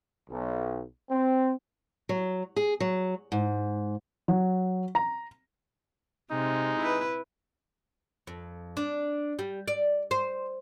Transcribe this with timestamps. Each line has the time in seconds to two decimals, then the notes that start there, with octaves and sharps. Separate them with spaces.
0.30 B1
1.11 C4
2.09 F#3
2.56 G#4
2.80 F#3
3.32 G#2
4.28 F#3
4.95 A#5
6.31 C3 G#3 D#4
6.79 E4 B4
8.27 F2
8.77 D4
9.39 G3
9.68 D5
10.11 C5